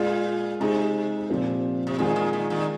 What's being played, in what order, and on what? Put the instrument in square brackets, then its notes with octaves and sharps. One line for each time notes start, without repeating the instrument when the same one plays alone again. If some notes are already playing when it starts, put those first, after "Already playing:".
Already playing: [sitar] A#2 [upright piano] G#3 F4 G#4
[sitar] C3 [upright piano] G#3 D#4 G#4
[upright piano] A#2 F3 C4
[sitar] C3
[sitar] A#2 D#3 [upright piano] G#3 F4 G#4
[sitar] A#2 D#3
A#2 D#3
A#2 D#3